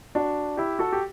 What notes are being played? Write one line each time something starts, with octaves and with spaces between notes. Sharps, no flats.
D4 F#4
E4 G4
F#4 A4
G4